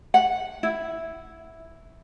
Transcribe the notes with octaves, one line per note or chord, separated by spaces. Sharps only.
F#5
E4